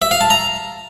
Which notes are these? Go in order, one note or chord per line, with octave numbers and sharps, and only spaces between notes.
E5
F5
A5
A#5